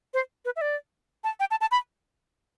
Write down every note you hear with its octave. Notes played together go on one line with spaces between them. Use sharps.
C5
B4
E5
D5
A5
G5
A5
A5
B5